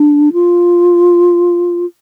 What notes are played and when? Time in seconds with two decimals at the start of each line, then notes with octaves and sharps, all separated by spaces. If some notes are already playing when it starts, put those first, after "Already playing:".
Already playing: D4
0.33 F4